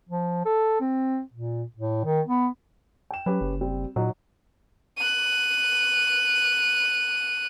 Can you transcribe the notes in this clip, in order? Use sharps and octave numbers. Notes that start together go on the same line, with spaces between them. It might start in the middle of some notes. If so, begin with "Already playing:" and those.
F3
A4
C4
A#2
A2
D#3
B3
G5 E7
F#3 C#4 G4 B4
F#1
G3 C4
A#2 F#3 D#4
F#6 D#7